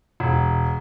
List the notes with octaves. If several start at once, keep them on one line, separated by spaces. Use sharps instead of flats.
E1